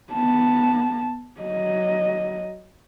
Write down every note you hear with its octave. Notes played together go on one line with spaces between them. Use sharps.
B3 A5
F#3 D#5